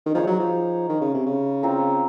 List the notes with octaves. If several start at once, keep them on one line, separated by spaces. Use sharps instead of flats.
D#3
F3 D#4 G#4 C#5 F5
F#3
F3
D#3
C#3
C3
C#3
C4 F4 A#4